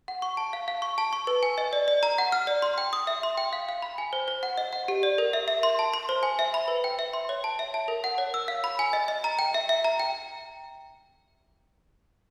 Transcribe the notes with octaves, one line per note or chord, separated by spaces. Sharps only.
F#5
C#6
A5
F5
F5
C#6
A5
C#6
B4
G#5
D#5
D5
D5
A#5
F#5
F6
D5
C6
G5
D#6
E5
C6
G5
F5
F5
B5
G#5
C5
C5
F#5
D#5
F#5
G4
D5
A#4
E5
E5
C6
A5
C6
C5
G#5
E5
B5
B4
G5
E5
C6
C#5
A5
E5
A5
A#4
F#5
C#5
E6
F5
B5
G#5
D#5
D#5
A#5
G5
E5
E5
A#5
G5